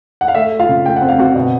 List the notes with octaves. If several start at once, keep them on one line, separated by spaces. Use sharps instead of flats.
F#5
F5
A3 E5
A3
F4 F5
C#3
A3 G5
F#5
C4
F5
C4 F#4 F#5
B2